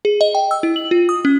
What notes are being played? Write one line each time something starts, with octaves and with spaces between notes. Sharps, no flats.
G#4
D#5
G5
E6
E4
F#7
F4
D#6
C#4